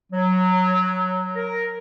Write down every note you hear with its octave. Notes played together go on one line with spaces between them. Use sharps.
F#3
A#4